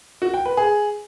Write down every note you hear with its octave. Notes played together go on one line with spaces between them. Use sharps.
F#4
G5
B4
G#4